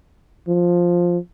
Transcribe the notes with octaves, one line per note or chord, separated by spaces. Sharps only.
F3